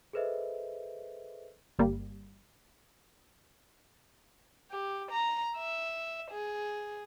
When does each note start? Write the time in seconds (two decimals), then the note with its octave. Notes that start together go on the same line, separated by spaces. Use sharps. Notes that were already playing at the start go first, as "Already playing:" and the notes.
0.13 G#4 A4 B4 C5 D#5 E5
1.79 G1 G3 A#3
4.71 G4
5.12 A#5
5.57 E5
6.31 G#4